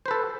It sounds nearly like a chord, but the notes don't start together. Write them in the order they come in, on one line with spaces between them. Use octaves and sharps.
C5 B4 A4